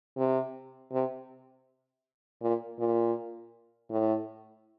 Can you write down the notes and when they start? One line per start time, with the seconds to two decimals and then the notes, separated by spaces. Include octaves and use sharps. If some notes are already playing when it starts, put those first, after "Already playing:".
0.17 C3
0.92 C3
2.42 A#2
2.79 A#2
3.91 A2